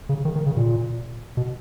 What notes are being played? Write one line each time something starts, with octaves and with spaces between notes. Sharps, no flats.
C#3
D#3
D#3
C#3
A#2
B2